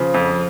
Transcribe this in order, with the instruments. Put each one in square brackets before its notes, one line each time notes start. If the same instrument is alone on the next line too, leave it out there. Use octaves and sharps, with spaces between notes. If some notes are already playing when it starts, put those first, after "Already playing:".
Already playing: [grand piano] C#3 [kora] F3
[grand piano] F2